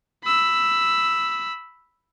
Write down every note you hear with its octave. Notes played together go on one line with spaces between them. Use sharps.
B5 E6